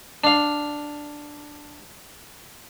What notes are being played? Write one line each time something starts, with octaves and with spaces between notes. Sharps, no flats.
D4 F5